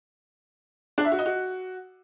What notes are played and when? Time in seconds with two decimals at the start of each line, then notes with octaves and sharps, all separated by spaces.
0.98 D4
1.05 E5
1.12 F#4
1.19 D#5
1.26 F#4